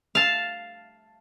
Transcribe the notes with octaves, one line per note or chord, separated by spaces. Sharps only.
F5 A5